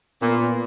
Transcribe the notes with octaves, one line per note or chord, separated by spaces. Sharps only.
A#2 B3